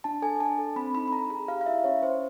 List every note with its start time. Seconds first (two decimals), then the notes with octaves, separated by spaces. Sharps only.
0.04 D4 A5
0.22 A4 G#5
0.40 D4 A5
0.58 A4
0.76 C4 B5
0.95 D#4 B5
1.08 B5
1.13 D#4 A#5
1.30 G#4 A#5
1.48 G4 F5
1.61 F5
1.66 E4 E5
1.84 C#4 C#5
2.02 C#4 C5